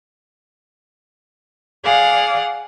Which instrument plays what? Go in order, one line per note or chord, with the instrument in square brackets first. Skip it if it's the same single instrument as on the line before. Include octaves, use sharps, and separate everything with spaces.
[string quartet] G#4 D5 F5 F#5